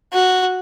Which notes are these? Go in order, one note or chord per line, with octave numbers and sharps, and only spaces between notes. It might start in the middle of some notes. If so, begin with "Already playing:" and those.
F#4